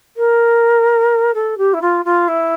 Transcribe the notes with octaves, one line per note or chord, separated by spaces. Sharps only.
A#4
A4
G4
E4
F4
F4
E4